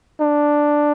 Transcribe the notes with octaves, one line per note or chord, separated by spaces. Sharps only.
D4